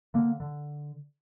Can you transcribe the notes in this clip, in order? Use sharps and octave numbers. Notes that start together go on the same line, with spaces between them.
D3 A#3
D3